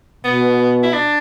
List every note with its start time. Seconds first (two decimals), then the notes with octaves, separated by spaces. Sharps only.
0.24 B2 B3
0.83 E4
0.93 D4